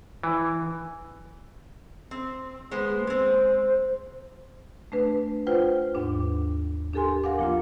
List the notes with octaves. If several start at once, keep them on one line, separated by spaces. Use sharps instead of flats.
E3
C4
G#3 B3 G#4 C5
A#3
G#3 C4 C5
A3 D4 B4
F4 B4 C5 F#5 G5
D#2 G#2 D4 D6
D4 G4 A4 A#4 G#5 C6
A#4 F5 F#5 D6
F3 A#3 F4